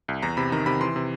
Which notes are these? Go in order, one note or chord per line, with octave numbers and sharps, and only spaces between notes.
C2
E2 A#5
C3 B5
D#3 A#5
C3 B5
E3 C6
C3